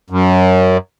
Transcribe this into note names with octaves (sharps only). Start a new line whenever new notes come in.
F#2